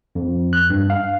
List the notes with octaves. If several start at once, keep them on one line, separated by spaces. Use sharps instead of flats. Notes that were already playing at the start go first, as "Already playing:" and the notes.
F2
F#6
G2
F5